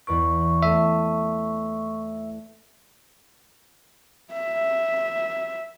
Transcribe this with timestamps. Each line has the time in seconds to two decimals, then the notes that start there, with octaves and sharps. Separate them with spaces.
0.07 E2 B4 C#6 D7
0.63 A3 E5 D#7
4.33 E5